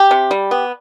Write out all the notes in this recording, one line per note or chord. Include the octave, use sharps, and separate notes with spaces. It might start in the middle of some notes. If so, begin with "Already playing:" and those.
Already playing: G4
C3
G3
B3